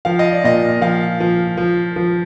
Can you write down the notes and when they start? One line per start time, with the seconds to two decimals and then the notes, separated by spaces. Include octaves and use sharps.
0.05 F3 F5
0.19 D#5
0.32 D5
0.44 A#2 D#5
0.81 F3 F5
1.20 F3
1.57 F3
1.96 F3